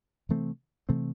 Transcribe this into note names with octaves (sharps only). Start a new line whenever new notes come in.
C3 E3 A3 C4
C3 E3 A3 C4